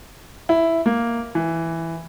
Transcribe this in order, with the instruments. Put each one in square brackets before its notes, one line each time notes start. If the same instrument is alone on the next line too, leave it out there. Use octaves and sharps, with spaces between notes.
[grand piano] E4
A#3
E3